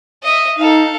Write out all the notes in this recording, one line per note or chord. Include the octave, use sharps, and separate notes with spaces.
D#5 E5
D#4 A4 F5